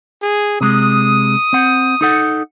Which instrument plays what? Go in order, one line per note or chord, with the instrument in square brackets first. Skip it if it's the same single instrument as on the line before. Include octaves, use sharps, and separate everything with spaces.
[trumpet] G#4
[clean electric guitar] C3 G#3 [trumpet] D#6
[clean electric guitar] C4 F#5
D#4 A4 F#5